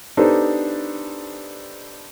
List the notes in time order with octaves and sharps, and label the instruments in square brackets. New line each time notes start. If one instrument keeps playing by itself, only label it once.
[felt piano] B3 D4 D#4 G4 A4 C5